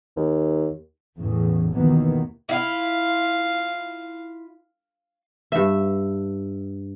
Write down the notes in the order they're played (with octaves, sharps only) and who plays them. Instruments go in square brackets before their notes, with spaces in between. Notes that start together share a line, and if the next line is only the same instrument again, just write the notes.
[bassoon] D#2
[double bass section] E2 A2 C#3
D#2 B2 D#3 E3 A#3 B3
[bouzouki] E4 F4 [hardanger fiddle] F5
[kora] G2 E5